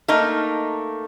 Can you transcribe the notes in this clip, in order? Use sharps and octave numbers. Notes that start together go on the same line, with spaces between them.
A3 A#3 D#4